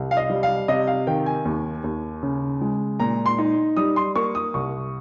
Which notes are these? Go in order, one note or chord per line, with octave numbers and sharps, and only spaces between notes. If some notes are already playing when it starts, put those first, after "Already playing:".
Already playing: C2
F5
D#5
G3
F5
C3 D#5
F5
D#3 G5
G#5
D#2
D#2
C#3
G#3
A#2 A#5
C6
D#4
G3 D#6
C6
A#3 C#6
D#6
C2 C#6